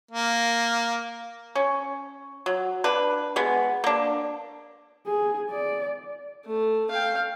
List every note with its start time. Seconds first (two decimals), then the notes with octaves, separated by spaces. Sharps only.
0.11 A#3
1.55 C#4
2.46 F#3
2.84 D4 B4
3.36 G#3 B3
3.84 A#3 D4
5.06 G#4
5.51 D5
6.46 A3
6.90 F5 G5